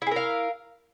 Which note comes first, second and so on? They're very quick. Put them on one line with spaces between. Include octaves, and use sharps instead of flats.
E4 G#4 A#4 F5